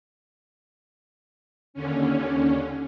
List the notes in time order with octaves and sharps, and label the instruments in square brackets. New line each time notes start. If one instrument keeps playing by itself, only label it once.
[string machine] D#2 D3 C#4